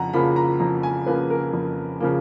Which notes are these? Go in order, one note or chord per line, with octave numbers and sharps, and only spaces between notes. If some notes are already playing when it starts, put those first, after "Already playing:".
Already playing: F2 C#3 F#5 A#5
C#3 F3 A#3 B5
A#5
F2 A#5
G#5
C#3 F3 A#3 B4
A#4
F2
C#3 F3 A#3